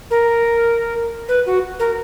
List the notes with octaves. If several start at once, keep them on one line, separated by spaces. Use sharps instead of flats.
A#4
B4
F#4
A#4